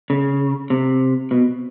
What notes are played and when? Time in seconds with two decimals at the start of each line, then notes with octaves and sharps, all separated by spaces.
0.10 C#3
0.70 C3
1.31 B2